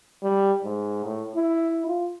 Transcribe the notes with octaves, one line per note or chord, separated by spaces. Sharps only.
G3
G#2
A2
E4
F4